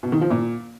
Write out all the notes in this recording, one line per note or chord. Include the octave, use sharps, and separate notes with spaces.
B2
D#3
F3
A#2